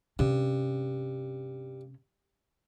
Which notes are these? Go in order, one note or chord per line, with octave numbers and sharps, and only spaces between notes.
G2 C3 C#4